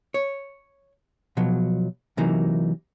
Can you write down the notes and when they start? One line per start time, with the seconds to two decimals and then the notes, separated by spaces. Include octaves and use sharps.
0.14 C#5
1.37 B2 F3 F#3
2.17 C3 E3 F#3 A#3 D#4